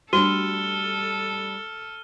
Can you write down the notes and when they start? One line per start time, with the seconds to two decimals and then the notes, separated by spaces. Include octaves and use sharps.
0.13 G3 A3 D4 F#4 A4 F6 D#7 G7